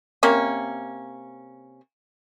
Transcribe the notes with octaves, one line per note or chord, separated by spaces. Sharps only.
C3 A#3 C#4